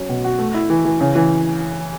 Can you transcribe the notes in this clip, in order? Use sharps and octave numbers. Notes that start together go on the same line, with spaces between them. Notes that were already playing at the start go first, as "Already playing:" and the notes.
Already playing: F#3 C#4
B2
F#4
A3
E4
E3
E3
C#3
E3